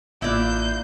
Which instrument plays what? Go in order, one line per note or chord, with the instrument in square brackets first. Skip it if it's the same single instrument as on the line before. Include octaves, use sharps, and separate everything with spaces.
[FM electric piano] A1 F4 F#6 [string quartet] A#3 G6 [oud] E4 D5